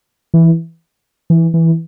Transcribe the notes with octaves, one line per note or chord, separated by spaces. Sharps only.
E3
E3
E3